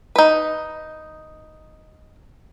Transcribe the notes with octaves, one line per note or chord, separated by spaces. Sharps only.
D#4 B4